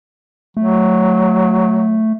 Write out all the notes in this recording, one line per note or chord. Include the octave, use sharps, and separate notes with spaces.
F#3 A3